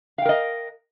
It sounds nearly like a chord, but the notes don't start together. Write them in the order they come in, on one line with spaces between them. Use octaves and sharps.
F5 G5 A#4 D#5